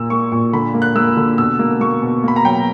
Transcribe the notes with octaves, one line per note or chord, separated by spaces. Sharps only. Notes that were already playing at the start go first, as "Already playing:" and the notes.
Already playing: A#2 A#3 E6
A#3 C#6
A#2 C#6
D3 B5
A#3
F#6
A#3 E6
D3
B2 E6
A#3
A#3 C#6
B2
A#3 B5
A#5
F#3 G5